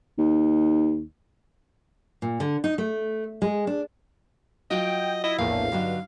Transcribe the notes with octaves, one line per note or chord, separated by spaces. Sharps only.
D#2
A#2
D3
D#4
A3
G#3
D4
F#3 F4 F#4 D#5 G5
E4 D#5
A#1 E2 A2 F3 A#3 F5
G2 D3 F#3 D#4